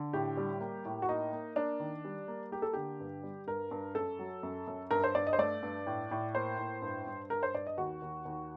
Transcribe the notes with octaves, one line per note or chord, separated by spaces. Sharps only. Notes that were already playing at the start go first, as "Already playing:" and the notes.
Already playing: D3
A2 G4
G3
A#3
A2
F#4
A#3 D#4
A#3
A#3 D4
D#3
G3
A#3
A#3 G4
A4
D3 G4
G2
G3
G2 A#4
G2
F#2 A4
F#3
F#2
F#2
G2 A#4
C5
G2 D5
D#5
C5
A3 D5
G2
A2
A2
A#3 C5
A2
G2
G2
G2 A#4
C5
G2 D5
D#5
D#2 F#4
D#2
D#2